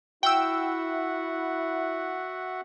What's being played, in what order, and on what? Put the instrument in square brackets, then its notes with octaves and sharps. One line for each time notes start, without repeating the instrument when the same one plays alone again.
[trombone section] E4 [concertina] F#4 E5 F#5 [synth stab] G5 E6